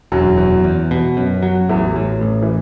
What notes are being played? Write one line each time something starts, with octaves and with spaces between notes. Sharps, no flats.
E1 F#2 F#3
E2
E2
B2
F#2
F#3
A1 E2 E3
A2
A1
E3